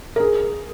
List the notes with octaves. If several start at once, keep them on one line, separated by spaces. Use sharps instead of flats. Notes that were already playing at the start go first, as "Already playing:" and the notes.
A#4
G#4